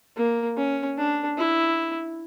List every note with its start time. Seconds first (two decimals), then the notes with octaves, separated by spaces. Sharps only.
0.17 A#3
0.57 C#4
0.97 D4
1.38 E4